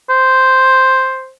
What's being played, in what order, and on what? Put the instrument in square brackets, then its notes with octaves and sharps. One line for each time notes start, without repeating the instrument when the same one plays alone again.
[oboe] C5